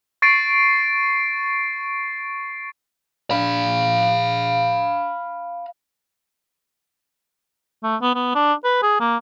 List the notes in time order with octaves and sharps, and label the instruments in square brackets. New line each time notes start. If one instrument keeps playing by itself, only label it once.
[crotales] C#6 A6 C7 D7 D#7
[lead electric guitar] F5 B5
[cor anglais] A3
B3
B3
D4
B4
G#4
A#3